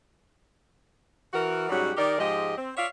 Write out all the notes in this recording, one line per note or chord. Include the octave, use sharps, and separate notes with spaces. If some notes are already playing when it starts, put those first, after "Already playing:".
E3 F#4 A#4
G#2 F#3 G3 C#4 F#4 G4
D#3 D#4 G4 A#4 D5
G#2 F3 G#3 G4 D#5
C4
C#5 D5 E5 F5